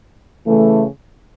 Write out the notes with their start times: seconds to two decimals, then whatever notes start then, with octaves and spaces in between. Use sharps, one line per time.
0.45 C#3 E3 A3